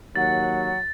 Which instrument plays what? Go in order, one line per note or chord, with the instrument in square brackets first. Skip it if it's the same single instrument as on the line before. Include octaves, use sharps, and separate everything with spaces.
[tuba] D#2 [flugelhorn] F#3 [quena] F#5 [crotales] A6